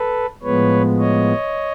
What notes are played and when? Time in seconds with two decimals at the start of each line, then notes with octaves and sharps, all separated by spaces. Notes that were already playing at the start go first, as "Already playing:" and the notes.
Already playing: A4 B4
0.43 A2 F3 G#3 B3 B4 C#5
0.99 C#5 D#5